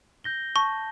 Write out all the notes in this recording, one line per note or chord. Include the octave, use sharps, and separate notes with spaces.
G6 A#6 G7
A5 C#6